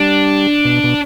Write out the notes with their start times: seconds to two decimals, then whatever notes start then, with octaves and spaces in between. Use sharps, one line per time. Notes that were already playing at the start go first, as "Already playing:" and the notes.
Already playing: G3 D4
0.65 B2
0.84 B2